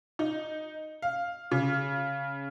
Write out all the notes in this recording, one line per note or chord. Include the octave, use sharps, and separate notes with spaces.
D#4
F5
C#3